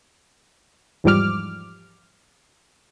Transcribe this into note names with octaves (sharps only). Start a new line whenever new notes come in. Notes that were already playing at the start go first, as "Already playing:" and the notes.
E2 G#2 F3 G3 D6 F6